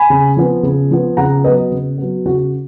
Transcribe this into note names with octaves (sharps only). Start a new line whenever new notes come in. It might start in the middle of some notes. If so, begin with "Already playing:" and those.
Already playing: G#5 B5
C#3
F3 B3
C#3
F3 B3
C#3 F#5 A#5
F#3 B3 B4 D#5
C#3
F#3 B3
C#3 F#4